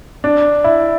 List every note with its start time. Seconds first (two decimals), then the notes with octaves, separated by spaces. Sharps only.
0.24 D4
0.64 E4